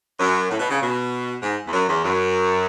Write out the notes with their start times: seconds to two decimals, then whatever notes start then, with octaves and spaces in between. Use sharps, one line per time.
0.19 F#2
0.50 A2
0.59 B2
0.70 C#3
0.81 B2
1.42 G#2
1.66 E2
1.73 F#2
1.88 E2
2.04 F#2